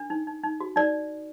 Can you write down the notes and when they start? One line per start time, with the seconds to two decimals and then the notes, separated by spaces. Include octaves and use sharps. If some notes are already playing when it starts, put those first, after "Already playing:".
Already playing: D4
0.10 D#4
0.27 D#4
0.44 D#4
0.60 F#4
0.76 D#4 D5